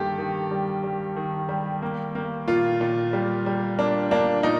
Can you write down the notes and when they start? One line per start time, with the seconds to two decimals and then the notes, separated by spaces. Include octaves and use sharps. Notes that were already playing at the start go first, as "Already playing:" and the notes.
Already playing: G2 D#3 A#3 G4 A4
0.18 D#3
0.51 G3
0.83 G3
1.16 D#3
1.49 G3
1.82 A#3
2.15 A#3
2.48 A#2 F4
2.81 A#2
3.13 G3
3.46 G3
3.78 A#3 D4
4.11 A#3 D4
4.43 A#2 D#4